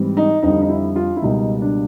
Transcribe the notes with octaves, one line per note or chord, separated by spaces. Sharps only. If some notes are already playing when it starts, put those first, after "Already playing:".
Already playing: G#2 E3 G3 C4
D#4
F2 D3 G3 D#4
D#4
E4
F4
E4
C#2 B2 G3 A#3 D#4
D4